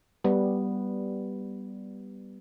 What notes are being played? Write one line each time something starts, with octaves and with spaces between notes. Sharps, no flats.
G3 B3